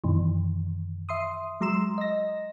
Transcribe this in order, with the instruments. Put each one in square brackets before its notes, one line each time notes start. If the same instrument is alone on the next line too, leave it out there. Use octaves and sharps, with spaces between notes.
[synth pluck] F#2 B2 D#3 E3
E5 C6 D#6
F#3 G#3 A#5 C6 E6 E7
D#5 A#6